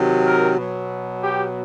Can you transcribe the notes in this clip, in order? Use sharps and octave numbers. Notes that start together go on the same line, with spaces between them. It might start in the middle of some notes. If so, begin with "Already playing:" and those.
Already playing: C3 D#3 F#3
A#4
B2 F#3
G4